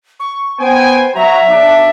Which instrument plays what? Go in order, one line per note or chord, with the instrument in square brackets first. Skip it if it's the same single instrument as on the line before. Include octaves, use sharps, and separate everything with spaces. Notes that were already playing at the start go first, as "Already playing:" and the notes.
[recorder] C#6
[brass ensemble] B3 G5 G#5 [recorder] C5
[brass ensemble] F#3 A#5 [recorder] E5
[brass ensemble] B1 D4